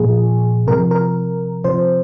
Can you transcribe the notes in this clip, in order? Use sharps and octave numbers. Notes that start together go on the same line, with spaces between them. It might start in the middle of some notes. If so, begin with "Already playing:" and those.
Already playing: A#2 F3 G#4
C3 F3 A#4
A#4
C3 F3 C5